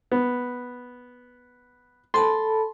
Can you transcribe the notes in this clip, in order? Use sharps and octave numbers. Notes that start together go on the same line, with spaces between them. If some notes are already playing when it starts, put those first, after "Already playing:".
B3
A4 A5 B5 C6